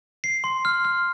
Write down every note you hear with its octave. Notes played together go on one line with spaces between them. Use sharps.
C7
C6
F6
F6